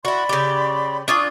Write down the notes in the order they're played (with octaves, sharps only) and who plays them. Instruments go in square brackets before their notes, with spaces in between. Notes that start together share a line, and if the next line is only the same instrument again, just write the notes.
[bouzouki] E4 F#4 [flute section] D5 B5 C6
[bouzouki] C#3 G4
[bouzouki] D4 F4 G#5 [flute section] C#6 D#6